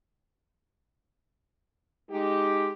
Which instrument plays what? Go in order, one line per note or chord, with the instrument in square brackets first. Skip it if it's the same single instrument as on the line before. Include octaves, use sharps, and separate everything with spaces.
[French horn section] G#3 D#4 G4